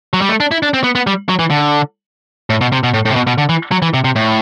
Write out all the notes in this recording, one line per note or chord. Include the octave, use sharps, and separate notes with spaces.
F#3
G3
A3
D4
E4
D4
C4
B3
B3
G3
F#3
E3
D3
A2
B2
C3
B2
A2
A2
C3
B2
B2
D3
E3
F#3
E3
C3
C3
A2